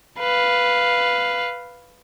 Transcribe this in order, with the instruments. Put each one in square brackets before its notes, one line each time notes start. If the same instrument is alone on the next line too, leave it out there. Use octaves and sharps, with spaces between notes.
[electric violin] B4 F5